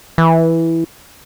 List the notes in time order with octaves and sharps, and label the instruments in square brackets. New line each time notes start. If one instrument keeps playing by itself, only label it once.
[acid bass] E3